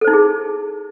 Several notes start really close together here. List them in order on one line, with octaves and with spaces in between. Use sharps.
A4 C5 D#4 E4 G#4